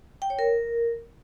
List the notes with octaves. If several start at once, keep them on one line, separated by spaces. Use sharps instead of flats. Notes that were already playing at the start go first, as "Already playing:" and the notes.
G5
C#5
A#4